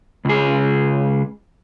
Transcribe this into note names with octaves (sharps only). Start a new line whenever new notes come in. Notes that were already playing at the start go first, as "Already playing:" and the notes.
C#2 G#4